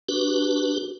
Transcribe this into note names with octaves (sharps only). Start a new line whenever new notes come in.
D4 F#4 G4 B4